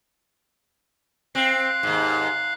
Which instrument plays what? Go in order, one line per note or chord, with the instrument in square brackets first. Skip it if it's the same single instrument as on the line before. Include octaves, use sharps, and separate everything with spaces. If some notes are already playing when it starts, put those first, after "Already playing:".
[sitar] C4 [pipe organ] F5 F#6
[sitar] D#2 G#2